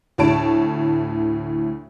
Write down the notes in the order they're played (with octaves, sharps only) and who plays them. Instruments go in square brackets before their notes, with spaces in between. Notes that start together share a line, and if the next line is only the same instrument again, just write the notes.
[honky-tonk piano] D2 A2 C#5 A5 D7